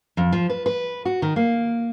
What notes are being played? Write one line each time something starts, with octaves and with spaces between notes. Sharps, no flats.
F2
F3
B4
B4
F#4
D#3
A#3